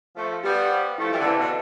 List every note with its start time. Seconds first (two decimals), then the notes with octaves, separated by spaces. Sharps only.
0.16 F3 A3 C5 F5
0.43 G3 B3 G4
0.70 C5 F5
0.98 F3 A3 E4
1.11 E3 G3
1.19 D3
1.25 C3 E3 B4 F5 A5
1.39 B2 D3